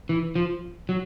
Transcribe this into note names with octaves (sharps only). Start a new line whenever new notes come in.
E3
F3
F#3